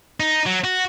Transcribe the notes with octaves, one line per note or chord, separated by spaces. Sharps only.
D#4
F#3
F#4